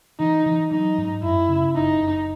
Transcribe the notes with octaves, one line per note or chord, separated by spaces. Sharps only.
E3 D#4
E3
F#3 D#4
G#2
F#2 E4
C#3
F#1 D#4
F#1